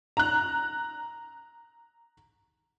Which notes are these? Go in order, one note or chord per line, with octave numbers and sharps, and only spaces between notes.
A#5 F#6